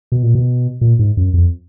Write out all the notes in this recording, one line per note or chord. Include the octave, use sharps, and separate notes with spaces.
B2
A#2
B2
A#2
G#2
F#2
F2